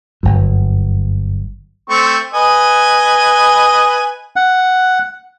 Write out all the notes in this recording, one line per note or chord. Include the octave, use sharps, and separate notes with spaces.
G1 F#2
A3 C4 C#6
B4 D#5 G#5
F#5